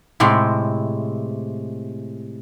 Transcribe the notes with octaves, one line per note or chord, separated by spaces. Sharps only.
A2 C3 G#3 C4